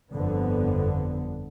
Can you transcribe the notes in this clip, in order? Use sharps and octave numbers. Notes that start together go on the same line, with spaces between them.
G1 F2 D3 B3